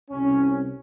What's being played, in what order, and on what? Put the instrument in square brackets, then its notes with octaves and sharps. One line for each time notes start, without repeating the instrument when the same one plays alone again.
[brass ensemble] C2 C3 C#4